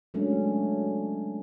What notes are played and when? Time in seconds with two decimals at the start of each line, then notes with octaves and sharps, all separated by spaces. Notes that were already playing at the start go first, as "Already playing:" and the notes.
0.14 F#3 G#3 A3 C#4 D4